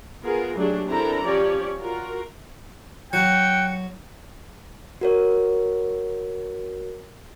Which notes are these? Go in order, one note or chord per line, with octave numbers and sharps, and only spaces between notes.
B3 F4 G#4 A#4
F#3 A3 D4 G4 G#4
C4 D4 E4 A4 A#4 A#5
F3 C#4 G4 C#5 D5
F4 F#4 A#4
F#3 G5 F#6 C#7
F#4 A#4 C#5